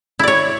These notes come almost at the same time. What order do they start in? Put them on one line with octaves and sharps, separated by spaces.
E4 D5 C#5